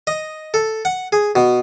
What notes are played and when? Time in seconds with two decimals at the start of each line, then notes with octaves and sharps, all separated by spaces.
0.07 D#5
0.54 A4
0.85 F#5
1.12 G#4
1.36 B2